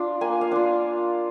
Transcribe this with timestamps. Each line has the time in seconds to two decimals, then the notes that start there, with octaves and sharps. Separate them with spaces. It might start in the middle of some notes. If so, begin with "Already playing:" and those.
Already playing: D4 F4
0.21 A#3 G#5
0.41 F5
0.52 D4 F4